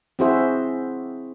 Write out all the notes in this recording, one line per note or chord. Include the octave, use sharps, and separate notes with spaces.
C4 E4 F#4 G#4 C5 E5